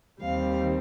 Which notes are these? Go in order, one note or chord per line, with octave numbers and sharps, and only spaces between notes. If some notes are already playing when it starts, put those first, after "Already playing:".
D#2 D#3 G3 C4 F5